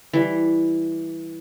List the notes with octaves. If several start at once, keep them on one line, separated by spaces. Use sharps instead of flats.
E3 G3